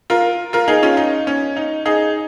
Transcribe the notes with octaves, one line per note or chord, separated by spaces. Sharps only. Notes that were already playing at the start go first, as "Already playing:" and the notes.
F4 A#4
F4 A#4
D#4 G#4
C#4 F4
D#4
C#4
D#4
D#4 G#4